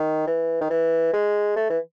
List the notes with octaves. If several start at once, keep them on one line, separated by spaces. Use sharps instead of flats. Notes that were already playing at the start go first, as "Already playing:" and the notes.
Already playing: D#3
E3
D#3
E3
G#3
A3
E3